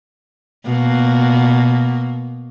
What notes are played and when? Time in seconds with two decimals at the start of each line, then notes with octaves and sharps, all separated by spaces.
0.66 B2 A#3